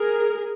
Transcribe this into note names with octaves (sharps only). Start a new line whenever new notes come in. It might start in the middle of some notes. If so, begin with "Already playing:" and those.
Already playing: G#4 A#4